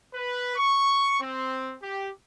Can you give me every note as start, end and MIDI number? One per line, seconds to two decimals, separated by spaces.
0.13 0.55 71
0.56 1.17 85
1.20 1.74 60
1.82 2.09 67